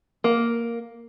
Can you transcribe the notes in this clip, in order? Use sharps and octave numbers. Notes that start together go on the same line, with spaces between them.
A#3